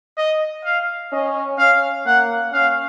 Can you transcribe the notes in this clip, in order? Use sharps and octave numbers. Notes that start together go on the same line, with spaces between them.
D#5
F5
C#4 D#5
C#4 F5
A#3 F#5
C#4 F5